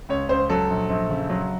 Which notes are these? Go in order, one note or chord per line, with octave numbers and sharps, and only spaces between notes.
C#2 C#5
C#2 C5
F#3 A4
A#1
A#1
C#3
F#3